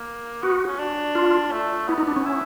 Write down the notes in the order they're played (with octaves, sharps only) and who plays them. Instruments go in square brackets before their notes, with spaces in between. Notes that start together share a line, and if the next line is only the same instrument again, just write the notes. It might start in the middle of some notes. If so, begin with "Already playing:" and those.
Already playing: [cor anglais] A#3
[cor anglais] B3 [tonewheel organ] F#4
[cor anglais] C#4
D4
[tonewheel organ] F4
[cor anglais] A3
[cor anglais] B3 [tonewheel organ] E4
[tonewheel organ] D#4
D4
C#4
[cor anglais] E4